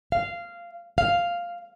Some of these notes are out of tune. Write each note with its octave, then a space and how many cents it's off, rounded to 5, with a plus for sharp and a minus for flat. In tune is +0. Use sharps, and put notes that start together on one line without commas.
F5 -15
F5 +0